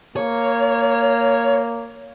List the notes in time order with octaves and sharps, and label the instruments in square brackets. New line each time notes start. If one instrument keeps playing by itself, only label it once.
[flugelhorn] A#3 [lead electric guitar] C#5